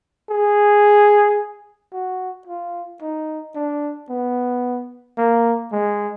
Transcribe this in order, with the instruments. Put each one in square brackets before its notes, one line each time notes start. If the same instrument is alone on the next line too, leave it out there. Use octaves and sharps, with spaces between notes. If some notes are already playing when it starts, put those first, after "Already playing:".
[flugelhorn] G#4
F#4
F4
D#4
D4
B3
A#3
G#3